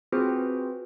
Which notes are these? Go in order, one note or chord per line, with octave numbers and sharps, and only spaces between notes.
C4 F4 F#4 G#4 B4 C5